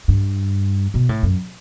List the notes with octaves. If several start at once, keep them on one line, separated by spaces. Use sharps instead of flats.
G2
B2
A2
F#2